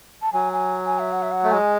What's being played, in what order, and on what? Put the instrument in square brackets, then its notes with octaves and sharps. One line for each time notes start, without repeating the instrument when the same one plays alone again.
[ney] A5
[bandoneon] F#3 [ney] G#5
[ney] G#5
G#5
E5
F#5
E5
F#5
[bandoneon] A3
[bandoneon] G#3 [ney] G#5